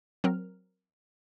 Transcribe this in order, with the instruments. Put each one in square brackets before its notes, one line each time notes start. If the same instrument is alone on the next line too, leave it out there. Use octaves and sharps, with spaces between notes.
[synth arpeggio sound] F#3 C4 A#4 F6